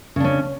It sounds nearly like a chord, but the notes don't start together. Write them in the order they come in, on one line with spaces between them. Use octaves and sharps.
C#3 D4 C#4